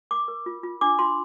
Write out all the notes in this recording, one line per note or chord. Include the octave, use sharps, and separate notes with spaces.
A#4 D6
A#4
F4
F4
D4 D6
F4 C6